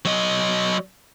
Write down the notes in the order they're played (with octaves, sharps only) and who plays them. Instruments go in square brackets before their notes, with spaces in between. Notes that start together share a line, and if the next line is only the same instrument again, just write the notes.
[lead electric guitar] F#3 D#5